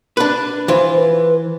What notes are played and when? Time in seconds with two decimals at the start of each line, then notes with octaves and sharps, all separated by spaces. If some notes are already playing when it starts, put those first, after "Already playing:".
0.17 D4 B4
0.68 E3 F4 C5
0.96 B4